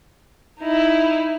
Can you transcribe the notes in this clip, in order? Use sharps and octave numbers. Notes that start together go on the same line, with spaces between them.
D#4 E4